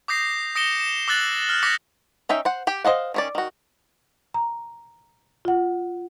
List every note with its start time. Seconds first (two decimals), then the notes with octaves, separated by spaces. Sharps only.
0.08 D6 D#6 G6 A#6 C7
0.56 D#6 A#6 C#7 D7 E7 G7
0.80 E7
1.08 D6 E6 F#6 A6 F#7
1.49 F6 G6
1.63 D6 D#6 G6 A#6 B6 C#7
2.29 C#4 D#4 E5 G5
2.45 C5 F#5
2.67 G4 G5
2.85 C5 D#5 F5 F#5
3.14 D#3 C#4 D5
3.35 D#3 F#4
4.34 A#5
5.45 F4 F#5